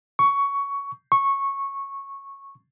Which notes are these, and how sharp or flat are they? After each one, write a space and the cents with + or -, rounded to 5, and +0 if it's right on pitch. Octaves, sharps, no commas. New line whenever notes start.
C#6 +15
C#6 -10